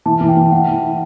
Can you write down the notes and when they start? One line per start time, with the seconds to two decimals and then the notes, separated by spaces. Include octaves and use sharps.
0.06 E3 A5
0.21 E3
0.29 G5
0.37 E3
0.52 E3 F#5
0.67 E3
0.82 E4